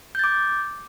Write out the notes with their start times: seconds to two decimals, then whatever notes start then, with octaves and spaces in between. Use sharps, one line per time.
0.15 G6
0.19 A6
0.24 D6